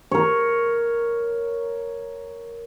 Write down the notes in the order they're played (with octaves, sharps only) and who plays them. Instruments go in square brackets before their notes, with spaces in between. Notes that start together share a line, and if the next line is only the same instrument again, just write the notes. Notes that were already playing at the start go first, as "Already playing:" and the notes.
[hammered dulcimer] A#4 C#5